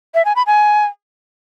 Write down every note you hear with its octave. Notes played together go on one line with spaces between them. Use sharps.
E5
G#5
B5
G#5